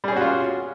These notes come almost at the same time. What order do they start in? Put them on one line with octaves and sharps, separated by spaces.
G3 G#4 C#4 F#4 F4